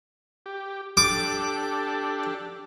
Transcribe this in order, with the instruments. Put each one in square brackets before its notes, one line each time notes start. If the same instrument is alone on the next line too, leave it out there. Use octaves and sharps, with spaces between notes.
[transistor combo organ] G4
[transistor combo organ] D4 G4 A4 [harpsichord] D6